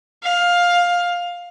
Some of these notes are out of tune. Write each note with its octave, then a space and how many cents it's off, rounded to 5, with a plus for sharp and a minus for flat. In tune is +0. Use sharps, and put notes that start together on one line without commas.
F5 +10